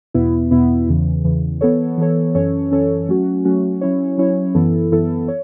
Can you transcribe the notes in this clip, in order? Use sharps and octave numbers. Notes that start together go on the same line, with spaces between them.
E2 B2 B3 E4
E2 B2 B3 E4
E2 C#3 E3
E2 C#3 E3
E3 B3 A4 C#5
E3 B3 A4 C#5
F#2 E3 C#4 A4 C#5
F#2 E3 C#4 A4 C#5
F#3 A3 C#4 F#4
F#3 A3 C#4 F#4
F#3 C#4 E4 C#5
F#3 C#4 E4 C#5
F#2 E3 B3 E4 A4
F#2 E3 B3 E4 A4
C#5